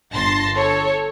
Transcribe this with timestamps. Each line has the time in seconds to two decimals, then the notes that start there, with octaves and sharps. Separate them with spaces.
0.13 G1 A5 C6 A#6
0.57 A4 C#5